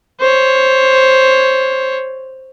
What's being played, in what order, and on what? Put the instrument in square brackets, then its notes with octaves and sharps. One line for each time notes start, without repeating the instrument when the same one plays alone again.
[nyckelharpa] C5 C#5